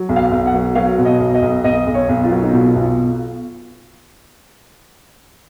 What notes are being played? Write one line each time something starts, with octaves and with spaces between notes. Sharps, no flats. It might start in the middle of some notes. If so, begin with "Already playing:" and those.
Already playing: F#3
B1
F5
B1
F#5
F#3
F#3 F5
B2
D#5
B1
D#5
B1
B1 D#5
B1
C#5
B1
F4
F#3
D#4
B2 F4
B1